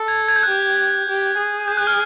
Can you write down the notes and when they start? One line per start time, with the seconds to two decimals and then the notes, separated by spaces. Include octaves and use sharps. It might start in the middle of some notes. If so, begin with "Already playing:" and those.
Already playing: A4
0.08 G#6
0.28 G#6
0.36 G6
0.43 F#6
0.48 G4 G6
1.08 G4
1.38 G#4
1.68 G6
1.77 F#6
1.87 F6